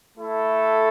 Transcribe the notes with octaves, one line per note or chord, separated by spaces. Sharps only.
A3 E4 A4